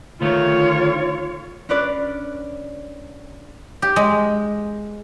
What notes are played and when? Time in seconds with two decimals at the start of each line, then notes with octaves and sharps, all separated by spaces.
0.21 D2 D#3 A3 F4 C#5
1.69 C#4 D4 B4 D5
3.82 G4
3.96 G#3